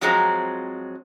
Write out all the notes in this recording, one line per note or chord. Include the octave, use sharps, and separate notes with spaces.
F2 F3 F#3 G#3 C4 A#5